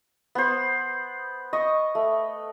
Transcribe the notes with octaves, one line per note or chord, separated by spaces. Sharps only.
B3 C5
D#5 C#6
A3